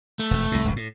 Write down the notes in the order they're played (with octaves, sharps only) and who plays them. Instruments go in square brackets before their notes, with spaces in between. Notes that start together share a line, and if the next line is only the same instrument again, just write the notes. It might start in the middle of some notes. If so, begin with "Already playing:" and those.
[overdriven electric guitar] A3
[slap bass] E1 F2
C2 A2
D1 G1 C#2
A2